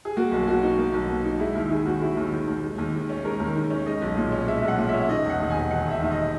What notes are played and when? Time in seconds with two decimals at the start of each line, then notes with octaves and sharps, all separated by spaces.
0.05 G#4
0.17 A#3 F#4
0.32 B1
0.47 B2 F#4
0.63 D#4
0.78 A#3
0.94 B1
1.09 B2
1.24 D#4
1.40 G#3 E4
1.55 D#2 E4
1.70 D#3 G#4
1.86 D#2 F#4
2.01 G#3 E4
2.17 D#2
2.32 D#3
2.48 D#2
2.63 G#3
2.78 D#2
2.94 D#3
3.09 C#4
3.25 G#3 A#4
3.40 D#2
3.55 D#3
3.70 C#4
3.86 G#3 D#5
4.02 B1
4.17 A#2
4.32 C#4
4.47 G#3 E5
4.63 B1
4.68 F#5
4.78 A#2
4.89 C#4 E5
5.09 D#3 D#5
5.24 E1
5.30 F#5
5.40 D#2
5.50 E1 G#5
5.71 D#3 F#5
5.86 E1 E5
6.02 D#2
6.11 D#5